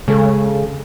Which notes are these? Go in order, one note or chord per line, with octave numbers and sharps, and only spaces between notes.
C#3 G#3 A4